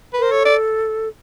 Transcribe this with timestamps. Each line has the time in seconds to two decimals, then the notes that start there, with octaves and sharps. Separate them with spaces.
0.14 B4
0.19 A#4 C5
0.31 A4 C#5
0.45 D5